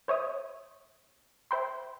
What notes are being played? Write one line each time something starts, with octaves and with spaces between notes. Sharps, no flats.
C5 C#5 E5 D#6
C5 E5 G5 B5 C6